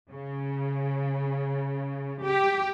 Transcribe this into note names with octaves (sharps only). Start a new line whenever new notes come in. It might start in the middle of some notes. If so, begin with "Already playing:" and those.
C#3
G4